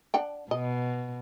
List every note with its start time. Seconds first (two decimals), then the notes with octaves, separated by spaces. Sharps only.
0.14 D4 F#5 G5
0.51 B2 D#5